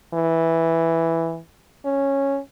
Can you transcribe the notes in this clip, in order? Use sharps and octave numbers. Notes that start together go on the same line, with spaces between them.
E3
C#4